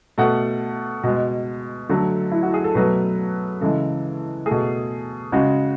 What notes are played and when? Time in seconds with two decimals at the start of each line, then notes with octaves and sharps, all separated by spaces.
0.18 B2 A3 F#5
1.03 B2 G#3
1.89 D3 F#3 A3
2.32 E4
2.43 F#4
2.54 G#4
2.64 A4
2.75 B2 F#3 A3 B4
3.61 C#3 E3 G#3 A4
4.46 A3 G#4
4.51 B2
5.32 C#3 G#3 F#4